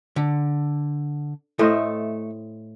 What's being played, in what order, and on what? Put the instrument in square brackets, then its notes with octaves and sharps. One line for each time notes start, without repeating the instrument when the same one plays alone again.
[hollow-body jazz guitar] D3
[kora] A2 C5 D#5 [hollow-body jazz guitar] A3